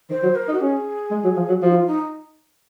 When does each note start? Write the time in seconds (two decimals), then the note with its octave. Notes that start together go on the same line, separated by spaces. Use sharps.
0.10 D#3 C5
0.23 F#3
0.35 A#4
0.48 D#4
0.53 F#4
0.61 C#4 G#4
1.11 G#3
1.24 F#3
1.36 F3
1.49 F#3
1.62 F3 F#4
1.70 D#4
1.75 F4
1.87 D#4